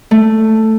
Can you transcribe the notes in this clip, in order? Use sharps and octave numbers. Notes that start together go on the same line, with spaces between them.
A3